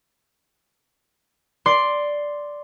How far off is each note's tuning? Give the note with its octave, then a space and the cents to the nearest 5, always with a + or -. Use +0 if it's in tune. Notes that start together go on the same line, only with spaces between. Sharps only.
D5 +0 C6 +0